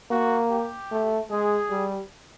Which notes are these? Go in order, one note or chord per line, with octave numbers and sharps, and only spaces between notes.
A#3 F#4
G4
A3
G#3 G#4
G3